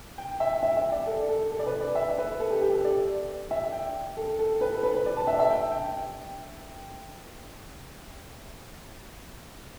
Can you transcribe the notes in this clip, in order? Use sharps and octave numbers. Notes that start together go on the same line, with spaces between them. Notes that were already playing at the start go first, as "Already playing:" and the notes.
G5
E5
E5
E5
D5
A4
A4
A4
D5
B4
D5
E5
B4
A4
G4
G4
A4
D5
E5
G5
A4
A4
B4
A4
B4
B4
D5
A5
E5
E5
G5
G5